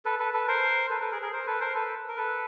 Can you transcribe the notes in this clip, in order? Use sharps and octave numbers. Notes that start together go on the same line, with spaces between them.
A4 B4
A4 B4
A4 B4
A#4 C5
A4 B4
A4 B4
G#4 A#4
G#4 A#4
A#4 C5
A4 B4
A#4 C5
A4 B4
A#4
A4 B4